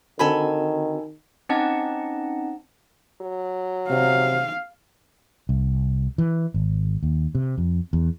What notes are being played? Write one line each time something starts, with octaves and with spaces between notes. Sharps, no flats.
D3 D#3 C4 F#4 A4 G#5 B5
C4 C#4 D#4 D#5 F#5 A5
F#3
C3 F5
C2
E3
G#1
D#2
C3
F2
E2